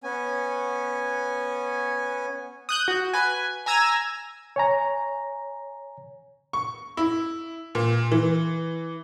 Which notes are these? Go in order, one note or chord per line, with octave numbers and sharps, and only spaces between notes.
B3 C#4 G#5
D#6 F#6 G6
F#4
B4 G#5
G#5 A#5 E6 G#6 A#6
C#5 G#5 A#5
C#6
E4
A#2
E3